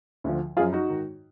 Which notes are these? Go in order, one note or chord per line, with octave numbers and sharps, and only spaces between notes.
D2 D3 F3
F#2 F3 F4 G#4
D#4 F#4
G#2 D#3